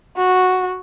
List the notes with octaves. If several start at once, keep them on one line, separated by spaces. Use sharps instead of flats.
F#4